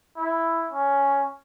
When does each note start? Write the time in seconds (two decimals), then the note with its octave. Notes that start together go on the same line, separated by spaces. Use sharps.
0.17 E4
0.72 C#4